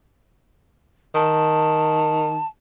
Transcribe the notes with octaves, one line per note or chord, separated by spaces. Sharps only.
D#3 A5